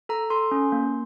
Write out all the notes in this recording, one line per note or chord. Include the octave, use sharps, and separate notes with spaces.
A4 A#5
A4 C6
C#4
A#3